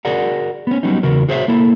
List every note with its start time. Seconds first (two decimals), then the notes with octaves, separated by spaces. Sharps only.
0.05 F#4 G#4 A#4 D5 F#5
0.67 B3 C#4
0.83 F#3 G3 B3 C#4 D#4
1.03 E2 C#3 F#4 A#4
1.29 F#4 G#4 C5 C#5 E5
1.48 A#3 E4 A4